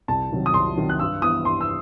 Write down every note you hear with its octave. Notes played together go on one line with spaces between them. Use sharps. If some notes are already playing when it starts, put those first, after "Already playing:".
C2 A5
C3 D#3 F#3
D#6
C2 C6
C3 D#3 F#3
F#6
G2 E6
E3 B3 D#6
G2 C6
E6